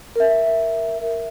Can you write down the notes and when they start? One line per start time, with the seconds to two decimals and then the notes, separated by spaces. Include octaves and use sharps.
0.16 A#4 E5